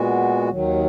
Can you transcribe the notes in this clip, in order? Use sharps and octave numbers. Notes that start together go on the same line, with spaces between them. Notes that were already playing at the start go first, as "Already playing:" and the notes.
Already playing: A#2 G#3 B3 F#4
D#2 D#3 F#3